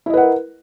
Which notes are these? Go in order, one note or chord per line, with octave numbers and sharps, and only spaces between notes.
E4 A#4 B4 D#5 F#5